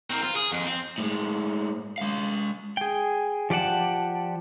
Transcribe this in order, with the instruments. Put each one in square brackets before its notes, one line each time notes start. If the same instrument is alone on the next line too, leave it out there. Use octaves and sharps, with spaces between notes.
[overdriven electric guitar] C4 A#4
F4
G#4
F2
C4
A2 G#3
G#3 F5
[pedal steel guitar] G#4 G5
F3 G4 D5 F#5 A5